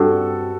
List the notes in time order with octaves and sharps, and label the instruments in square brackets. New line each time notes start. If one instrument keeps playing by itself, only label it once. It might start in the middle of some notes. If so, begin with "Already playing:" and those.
Already playing: [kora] G2 C4 [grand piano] F#4 A4